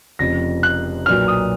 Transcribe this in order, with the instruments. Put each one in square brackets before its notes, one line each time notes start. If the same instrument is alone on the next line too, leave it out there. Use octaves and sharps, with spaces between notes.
[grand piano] F1 F2 C#3 F3 A#6
F#6
B1 A#2 F#3 B3 F6
D#6